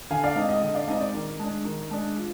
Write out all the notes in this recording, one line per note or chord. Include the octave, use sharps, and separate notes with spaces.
D3 F5 G#5
D5 F5
G#3 C4 D#4 D#5
D#5
D3 D#5
D5 F5
G#3 C4 D#4 D#5
D5
D#3
G#3 D4
D#3
G#3 D4
F3